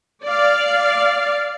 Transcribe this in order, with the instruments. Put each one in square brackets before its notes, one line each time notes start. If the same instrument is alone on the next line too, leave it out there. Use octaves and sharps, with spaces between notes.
[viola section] D5 F5